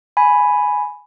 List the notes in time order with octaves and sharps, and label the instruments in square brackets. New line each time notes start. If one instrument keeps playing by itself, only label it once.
[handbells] G#5 B5